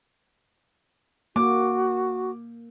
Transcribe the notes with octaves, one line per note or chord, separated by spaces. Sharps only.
A#3 F#4 D6